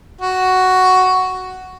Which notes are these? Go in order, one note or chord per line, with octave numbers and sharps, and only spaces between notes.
F#4